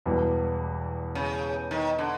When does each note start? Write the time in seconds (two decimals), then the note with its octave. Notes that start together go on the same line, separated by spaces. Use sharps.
0.06 E1 E2 B2 G3
1.15 C#3
1.71 D#3
1.99 D3